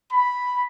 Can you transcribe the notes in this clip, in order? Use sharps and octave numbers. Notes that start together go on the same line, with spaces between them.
B5